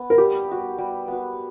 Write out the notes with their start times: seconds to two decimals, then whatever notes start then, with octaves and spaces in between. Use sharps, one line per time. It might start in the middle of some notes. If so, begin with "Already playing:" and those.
Already playing: B3
0.10 A#4
0.18 G3 G4
0.48 B3 F#4
0.78 G3
1.08 B3 F#4